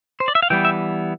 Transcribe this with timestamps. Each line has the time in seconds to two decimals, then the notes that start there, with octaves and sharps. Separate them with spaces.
0.20 C5
0.28 D5
0.35 E5
0.42 F5
0.50 E3 G3 B3 G5
0.65 E5